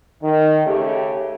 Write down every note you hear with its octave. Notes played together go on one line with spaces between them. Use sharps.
D#3
C#3 A3 G4